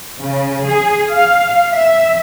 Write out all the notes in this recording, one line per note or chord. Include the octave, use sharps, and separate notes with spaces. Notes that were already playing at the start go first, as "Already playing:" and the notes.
C#3
G#4
F5
E5